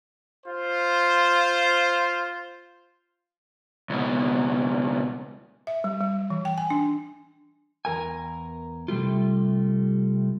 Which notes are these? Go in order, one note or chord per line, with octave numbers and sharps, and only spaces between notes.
F4 C5
C#2 B2
E5
G3
G3
E3
G5
G#5
D4
E2 A#4 G#5
C3 G3 A3 F4